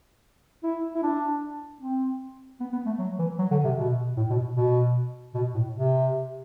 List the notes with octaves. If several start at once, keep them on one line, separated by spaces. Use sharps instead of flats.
E4
E4
D4
C4
B3
B3
A3
F#3
E3
F#3
D3
C3
B2
A2
B2
B2
B2
A2
C3